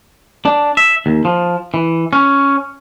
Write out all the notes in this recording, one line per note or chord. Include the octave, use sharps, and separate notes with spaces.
D4
E5
D#2
F3
E3
C#4